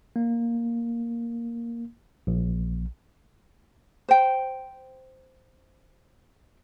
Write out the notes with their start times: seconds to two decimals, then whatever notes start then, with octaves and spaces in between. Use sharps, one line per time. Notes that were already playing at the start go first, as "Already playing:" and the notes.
0.16 A#3
2.27 A#1
4.09 C5 G5